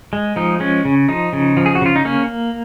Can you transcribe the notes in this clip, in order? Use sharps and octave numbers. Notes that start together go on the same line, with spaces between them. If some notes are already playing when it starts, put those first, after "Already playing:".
G#3
F3 D#4
G#3 C#4
C#3
F3 D#4
C#3
F3
G#4
F#4
C#3 F4
D#4
A#3 C#4